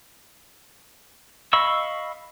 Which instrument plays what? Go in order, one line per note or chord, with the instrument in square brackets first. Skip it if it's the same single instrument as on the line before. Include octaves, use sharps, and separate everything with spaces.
[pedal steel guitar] D#5 F5 B5 C#6 E6